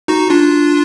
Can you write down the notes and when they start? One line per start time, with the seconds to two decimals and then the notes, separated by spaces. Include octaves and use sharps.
0.08 D#4 F#4
0.30 D4 F4